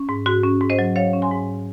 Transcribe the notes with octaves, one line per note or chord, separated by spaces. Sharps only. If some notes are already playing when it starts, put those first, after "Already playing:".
Already playing: C#4
G#2
G#2 F#4
C#4
G#2
C5 D#5
F#3
F#3 C#5 F5
C#4
G#5 C6
G#2